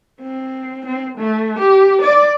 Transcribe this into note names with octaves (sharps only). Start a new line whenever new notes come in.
C4
C4
A3
G4
D5